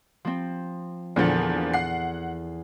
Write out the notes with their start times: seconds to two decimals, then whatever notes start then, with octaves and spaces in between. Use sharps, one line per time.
0.25 F3 C4
1.16 E2 A#2 D3 F3 A4
1.74 F#5 C7